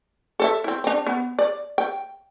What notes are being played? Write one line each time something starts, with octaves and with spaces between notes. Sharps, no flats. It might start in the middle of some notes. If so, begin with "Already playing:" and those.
A4 C5 E5
C4 E4
C4 D4
B3
D5
G5